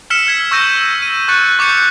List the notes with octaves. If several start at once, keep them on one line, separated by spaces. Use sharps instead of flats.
E6 F6 B6 C#7 E7
F6 G#6 B6
C#6 E6 G6 A#6 D#7
D#7
C#6 F#6 A6 C#7 D#7
C#6 D6 G6 C#7